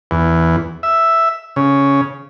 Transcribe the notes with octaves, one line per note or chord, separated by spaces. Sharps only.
E2
E5
C#3